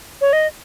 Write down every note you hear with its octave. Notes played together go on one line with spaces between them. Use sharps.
C#5
D#5